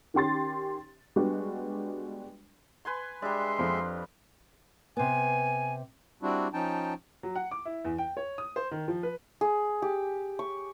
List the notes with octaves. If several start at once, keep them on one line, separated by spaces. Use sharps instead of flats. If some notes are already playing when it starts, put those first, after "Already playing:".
D#3 C#4 G4 C6 A6
G3 G#3 B3 D4 F#4
B4 G#5 C6
G3 G#3 D4 E5 C6
F2
C3 B3 G#5
G3 C4 D4 E4 F#4
F3 C#4 D#4 G5 A5
F#3
F#5
D6
E4
E2
G5
C#5
D#6
C5
D#3
F3
B4
G#4
G4
C#6